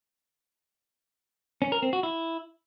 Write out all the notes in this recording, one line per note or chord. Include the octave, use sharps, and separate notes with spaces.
C#4
A#4
C4
F#4
E4